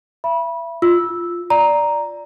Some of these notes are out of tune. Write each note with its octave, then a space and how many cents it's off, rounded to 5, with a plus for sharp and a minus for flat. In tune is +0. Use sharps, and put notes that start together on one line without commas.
E5 +35 B5 -25
F4 +0 E6 -5
D5 +0 A#5 +0